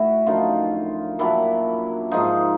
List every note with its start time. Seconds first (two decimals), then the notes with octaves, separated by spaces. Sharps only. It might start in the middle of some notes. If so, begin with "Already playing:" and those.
Already playing: A2 E4 F#4
0.27 F#2 D3 F3 D#4 F4
1.19 A#2 F#3 D4 E4
2.11 G#2 F3 D#4 F4